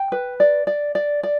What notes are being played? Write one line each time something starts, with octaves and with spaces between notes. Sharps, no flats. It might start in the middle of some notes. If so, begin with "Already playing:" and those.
Already playing: G5
B4
D5
D5
D5
D5